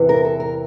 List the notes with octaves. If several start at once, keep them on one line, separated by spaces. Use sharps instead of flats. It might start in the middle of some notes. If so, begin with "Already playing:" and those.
Already playing: E2 C3 E3
A#4
A4
A#4